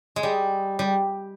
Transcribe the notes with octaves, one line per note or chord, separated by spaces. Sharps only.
G#3
G3
G3